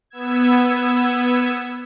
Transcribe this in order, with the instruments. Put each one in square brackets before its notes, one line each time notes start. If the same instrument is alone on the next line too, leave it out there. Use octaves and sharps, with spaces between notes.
[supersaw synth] B3 E6 G#6